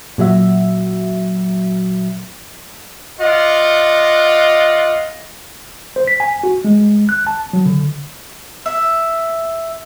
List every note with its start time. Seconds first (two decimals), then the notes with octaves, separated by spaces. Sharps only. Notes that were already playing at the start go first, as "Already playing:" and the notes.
0.18 A#2 F#3 F#4 E5
3.19 F4 D5 D#5 F#5
5.96 C5
6.08 B6
6.20 G#5
6.44 F#4
6.65 G#3
7.09 F#6
7.27 A5
7.53 F#3
7.66 D3
8.66 E5